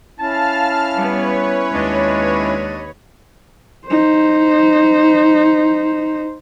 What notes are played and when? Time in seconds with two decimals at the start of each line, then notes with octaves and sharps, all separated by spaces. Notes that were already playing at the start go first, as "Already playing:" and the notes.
0.20 C#4 E4 F5 A5 F6
0.94 G3 B3 B4 C#5
1.72 D#2 G#3 D4 D#5
3.88 D#4 C5